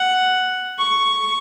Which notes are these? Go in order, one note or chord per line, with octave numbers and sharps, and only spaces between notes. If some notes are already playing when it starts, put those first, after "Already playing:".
Already playing: F#5
C#6